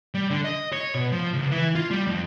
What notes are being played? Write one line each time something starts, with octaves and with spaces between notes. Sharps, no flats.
G3
D3
D#5
C#5
B2
F3
C#2
E3
F4
G3
F2